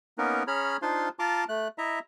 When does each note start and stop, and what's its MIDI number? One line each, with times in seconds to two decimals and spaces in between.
0.18 0.43 58
0.18 0.43 59
0.18 0.43 61
0.18 0.43 63
0.18 0.43 70
0.18 0.43 71
0.47 0.77 61
0.47 0.77 68
0.47 0.77 73
0.47 0.77 82
0.47 0.77 83
0.47 0.77 89
0.82 1.09 62
0.82 1.09 63
0.82 1.09 65
0.82 1.09 72
0.82 1.09 77
0.82 1.09 84
1.19 1.44 65
1.19 1.44 81
1.19 1.44 82
1.19 1.44 84
1.19 1.44 86
1.49 1.68 57
1.49 1.68 90
1.78 1.99 64
1.78 1.99 75
1.78 1.99 76
1.78 1.99 82